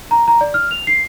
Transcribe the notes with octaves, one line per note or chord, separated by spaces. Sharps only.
A#5
A#5
D5
F6
F7
C7